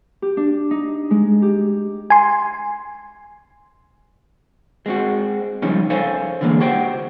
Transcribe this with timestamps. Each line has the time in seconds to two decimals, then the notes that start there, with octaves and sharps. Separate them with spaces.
0.22 G4
0.37 D4
0.71 D#4
1.11 G#3
1.42 G4
2.10 G#5 C6
4.86 G#3 C4 F#4
5.62 F3 G3 G#3 C#4 D#4
5.90 A4 C5 C#5 F5 G#5
6.41 D3 E3 G#3 A#3
6.60 F#4 G4 C5 F#5 G5